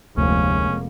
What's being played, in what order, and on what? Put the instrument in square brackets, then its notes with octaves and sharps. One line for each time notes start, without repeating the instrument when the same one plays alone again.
[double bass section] F1 G#3 A#3 [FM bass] D2 [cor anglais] C#4